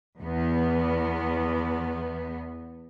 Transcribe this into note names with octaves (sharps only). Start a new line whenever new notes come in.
E2 B3